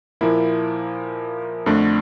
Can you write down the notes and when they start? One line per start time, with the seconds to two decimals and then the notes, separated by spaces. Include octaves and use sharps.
0.21 A#2 F3 A#3 E4
1.66 F2 D3 A3 D4